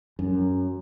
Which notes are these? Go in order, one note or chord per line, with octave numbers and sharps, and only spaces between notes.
F#2